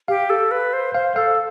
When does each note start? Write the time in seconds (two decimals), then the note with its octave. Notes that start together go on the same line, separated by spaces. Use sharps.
0.08 G4 F5
0.30 A4
0.51 B4
0.73 C5
0.94 C5 F5
1.16 A4 F5